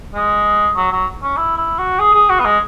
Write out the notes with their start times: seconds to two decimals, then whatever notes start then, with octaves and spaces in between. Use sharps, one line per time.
0.15 G#3
0.76 F#3
0.92 F#3
1.23 C#4
1.37 E4
1.58 E4
1.79 F#4
1.99 G#4
2.14 G#4
2.30 F#4
2.40 B3
2.45 G#3